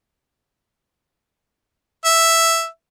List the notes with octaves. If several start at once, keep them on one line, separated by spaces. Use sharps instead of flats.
E5